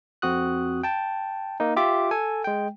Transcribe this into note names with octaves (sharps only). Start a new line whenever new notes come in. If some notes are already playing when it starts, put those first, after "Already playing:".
F2 C4 F#4 D#6 F#6
G5 A5
A#3 D#4
F4 G4 E5 D6
A4 G#5
G#3 G5